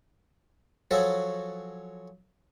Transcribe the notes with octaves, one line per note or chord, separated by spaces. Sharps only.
F3 F#3 F#4 G#4 A4 C#5